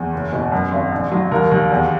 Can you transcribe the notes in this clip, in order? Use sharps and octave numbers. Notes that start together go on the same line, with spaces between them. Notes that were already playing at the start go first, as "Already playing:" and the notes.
Already playing: E2
F#1
B2
F#2
G#1
A#1
F#3
D#2 A#4
D#2
E2